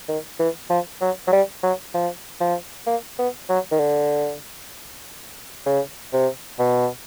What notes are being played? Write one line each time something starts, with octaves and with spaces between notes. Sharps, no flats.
D#3
E3
F3
F#3
F#3
G3
F#3
F3
F3
A#3
B3
F#3
D#3
D3
C#3
C3
B2